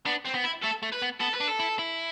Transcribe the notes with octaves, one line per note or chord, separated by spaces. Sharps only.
B3 D4
C4
B3
E4
A3 A4
A3
B4
B3
B3 A4
B4
D4
A4
E4
E4